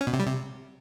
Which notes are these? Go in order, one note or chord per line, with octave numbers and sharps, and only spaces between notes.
C#4
B2
C3
G3
C3